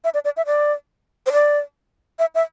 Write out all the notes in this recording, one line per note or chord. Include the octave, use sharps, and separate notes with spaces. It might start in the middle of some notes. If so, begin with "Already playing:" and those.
E5
D5
D5
E5
D5
C5
D5
E5
E5